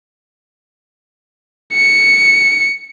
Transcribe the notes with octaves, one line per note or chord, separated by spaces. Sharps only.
C#7